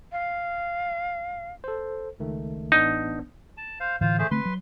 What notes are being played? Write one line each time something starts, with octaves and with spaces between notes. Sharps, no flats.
F5
A4 C5
C#2 D#3 A3
A1 B3 D4 D#4
A5
C5 F5
A2 D3 E3 F4 C5 F5
A3 G#4 C5
D3 A3 C4 B4 C6
F#3